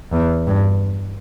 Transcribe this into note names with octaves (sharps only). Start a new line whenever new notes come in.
E2
G2